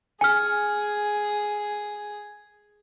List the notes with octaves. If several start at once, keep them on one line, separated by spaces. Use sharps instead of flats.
G#4 G#5 F6